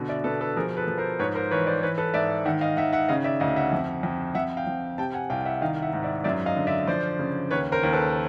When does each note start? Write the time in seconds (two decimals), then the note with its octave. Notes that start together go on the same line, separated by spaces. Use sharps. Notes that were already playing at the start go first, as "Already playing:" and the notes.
Already playing: B2 D3
0.09 D5 E5
0.24 B2 A4 B4
0.41 A4 B4
0.57 F3 G#4 A#4
0.77 A4 B4
0.87 F3
0.98 A#4 C5
1.19 G#2 B4 C#5
1.35 A#4 C5
1.51 E3 B4 C#5
1.67 C5 D5
1.82 E3 B4 C#5
1.98 A4 B4
2.14 G#2 D5 E5
2.45 D#3 E5 F#5
2.61 D#5 F5
2.77 D#3 E5 F#5
2.93 E5 F#5
3.08 C#3 D#5 F5
3.24 D5 E5
3.40 D2 D#5 F5
3.56 E5 F#5
3.72 F2
4.03 F2
4.35 F2 E5 F#5
4.57 F5 G5
4.67 F2
4.98 C3 G5 A5
5.14 F#5 G#5
5.30 C2 F5 G5
5.45 E5 F#5
5.61 D#3 D#5 F5
5.82 E5 F#5
5.93 G#2
6.03 D5 E5
6.24 F#2 D5 E5
6.46 D#5 F5
6.56 D3
6.67 D5 E5
6.87 F3 C5 D5
7.19 C#3
7.51 D#2 B4 C#5
7.72 A#4 C5
7.83 D#2
7.93 A4 B4